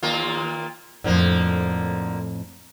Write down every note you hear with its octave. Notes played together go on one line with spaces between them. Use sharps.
D#2 A#3 F4
F2 A2 D3 F3 A#3